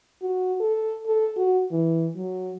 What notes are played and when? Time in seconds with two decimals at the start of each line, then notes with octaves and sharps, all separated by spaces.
0.22 F#4
0.60 A4
1.07 A4
1.38 F#4
1.72 E3
2.16 F#3